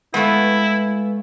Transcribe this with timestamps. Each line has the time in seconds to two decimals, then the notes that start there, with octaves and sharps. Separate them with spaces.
0.14 G#3 A3 B3 E4 B4 F5